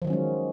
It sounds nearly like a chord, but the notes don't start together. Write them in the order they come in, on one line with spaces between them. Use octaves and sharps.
F3 D#3 F#3 C#4 G#3